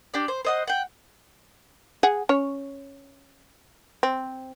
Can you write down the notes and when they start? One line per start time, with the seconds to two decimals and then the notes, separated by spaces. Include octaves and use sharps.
0.14 D4 G4 D5
0.28 C5
0.45 C5 D#5 F#5
0.67 F#5 G5
2.03 G#4 F#5
2.29 C#4 C#5
4.03 C4